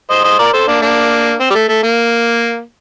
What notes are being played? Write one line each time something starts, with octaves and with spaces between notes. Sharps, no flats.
C5 D#5
C5 D#5
A#4 D5
A4 C5
A#3 D4
A#3 D4
C4
G3
A3
A3
A#3